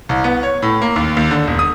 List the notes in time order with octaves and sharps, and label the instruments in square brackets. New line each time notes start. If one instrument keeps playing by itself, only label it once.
[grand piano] C2
B3
C#5
A2
A#3
D#2
D#2
D3
E1
D#6